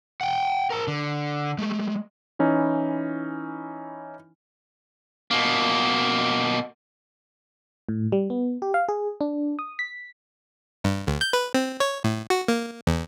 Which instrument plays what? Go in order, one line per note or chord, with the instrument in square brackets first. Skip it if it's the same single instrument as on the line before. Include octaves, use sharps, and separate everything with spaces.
[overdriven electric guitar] F#5 G5
A#4 A5
D3
G#3 A3
[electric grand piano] E3 C#4 D#4 E4
[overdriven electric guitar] B2 A#3
[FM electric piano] A2
G3
B3
G4
F5
G#4
D4
D#6
B6
[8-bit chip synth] G2
D2
G6
B4
C4
C#5
A2
F#4
A#3
E2